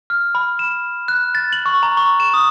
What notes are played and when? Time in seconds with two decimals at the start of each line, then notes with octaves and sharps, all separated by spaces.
0.10 F6
0.35 B5
0.59 E7
1.08 F#6
1.35 A6
1.53 F#7
1.66 C#6
1.83 A#5
1.97 C#6
2.20 E7
2.34 D#6